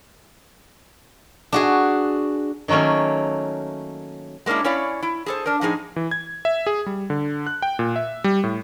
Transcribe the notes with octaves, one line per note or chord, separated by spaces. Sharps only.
D4 F#4 G#4
D#3 F#3 A3 A#3 C#4
G#3 A#3 C#4 D4 E4
C#4 E4 C#5 D5 F5
E4
G#4 A4 C5
D4 A#4
A2 F3 D#4 G#4
E3
G#6
E5
G#4
G3
D3
F#6
G5
A#2
E5
G3
A2